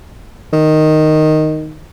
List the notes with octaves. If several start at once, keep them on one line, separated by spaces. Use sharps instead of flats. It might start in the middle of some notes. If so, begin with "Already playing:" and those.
D#3